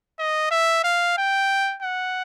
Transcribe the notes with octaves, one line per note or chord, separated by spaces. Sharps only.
D#5
E5
F5
G5
F#5